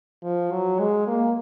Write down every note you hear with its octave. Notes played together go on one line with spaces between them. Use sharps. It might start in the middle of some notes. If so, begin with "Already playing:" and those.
F3
F#3
G#3
A#3